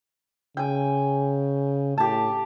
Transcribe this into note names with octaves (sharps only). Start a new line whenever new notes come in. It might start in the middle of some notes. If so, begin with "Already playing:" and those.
C#3 G5 G#5
A2 G4 A5